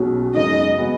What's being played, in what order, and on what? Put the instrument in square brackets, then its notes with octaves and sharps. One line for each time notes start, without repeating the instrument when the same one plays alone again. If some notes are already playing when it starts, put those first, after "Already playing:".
Already playing: [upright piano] B1 B2 F#3 C#4 G#4
[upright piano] F#2 C#3 G#3 D#4 [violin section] D#5
[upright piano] F#3 B3 G#4